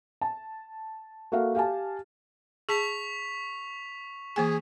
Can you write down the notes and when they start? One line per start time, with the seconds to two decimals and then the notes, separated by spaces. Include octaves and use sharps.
0.21 A5
1.32 A#3 F#4 A4 E5 F5
1.55 G4 F5 G#5 A5
2.69 G#4 A5 C#6 B6 F7
4.36 E3 A#3 G#4 G#5